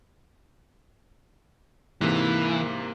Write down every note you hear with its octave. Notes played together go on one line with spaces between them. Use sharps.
G#2 C3 E3 A#3